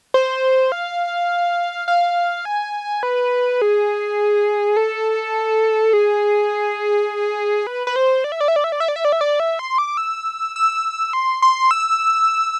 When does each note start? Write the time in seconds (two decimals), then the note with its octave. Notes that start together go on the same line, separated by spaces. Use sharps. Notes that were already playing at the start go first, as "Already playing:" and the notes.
0.14 C5
0.72 F5
1.88 F5
2.45 G#5
3.03 B4
3.62 G#4
4.77 A4
5.93 G#4
7.67 B4
7.87 B4
7.96 C5
8.24 D5
8.32 E5
8.41 D5
8.48 E5
8.56 D5
8.64 E5
8.72 D5
8.80 E5
8.88 D5
8.96 E5
9.05 D5
9.12 E5
9.21 D5
9.40 E5
9.59 C6
9.78 D6
9.97 E6
10.56 E6
11.13 C6
11.42 C6
11.71 E6